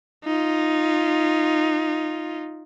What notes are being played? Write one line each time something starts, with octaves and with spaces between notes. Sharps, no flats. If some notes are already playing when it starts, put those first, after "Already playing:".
D#4 F4